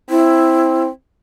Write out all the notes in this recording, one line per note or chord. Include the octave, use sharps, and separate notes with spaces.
C4 E4